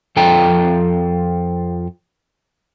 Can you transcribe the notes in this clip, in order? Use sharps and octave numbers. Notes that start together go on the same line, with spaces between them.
F2 F3 A4 G5 A#5